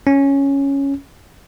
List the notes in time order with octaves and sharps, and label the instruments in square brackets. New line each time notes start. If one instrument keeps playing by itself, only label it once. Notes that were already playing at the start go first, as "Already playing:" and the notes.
[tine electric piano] C#4